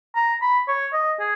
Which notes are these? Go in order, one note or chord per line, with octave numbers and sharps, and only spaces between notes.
A#5
B5
C#5
D#5
G#4